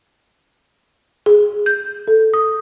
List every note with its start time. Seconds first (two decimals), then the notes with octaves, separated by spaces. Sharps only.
1.26 G#4
1.66 G6
2.08 A4
2.34 D#6